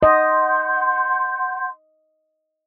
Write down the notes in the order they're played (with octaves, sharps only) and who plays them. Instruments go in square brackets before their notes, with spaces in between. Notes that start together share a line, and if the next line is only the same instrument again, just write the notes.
[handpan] D#5 [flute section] F#5 C6 G6